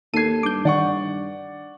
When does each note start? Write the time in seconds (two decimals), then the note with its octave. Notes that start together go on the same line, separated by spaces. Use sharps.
0.14 D#2 A4 G#6 C7 D#7
0.43 G2 D6 G6
0.65 D#3 D5 F#5 C#6